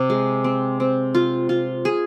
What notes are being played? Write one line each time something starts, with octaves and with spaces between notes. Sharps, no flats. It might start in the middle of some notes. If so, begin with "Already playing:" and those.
Already playing: C3
G#3
C4
C4
F4
F4
G#4